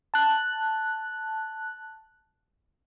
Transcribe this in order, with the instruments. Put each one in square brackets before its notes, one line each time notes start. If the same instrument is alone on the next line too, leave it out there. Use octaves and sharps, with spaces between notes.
[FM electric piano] A5 F#6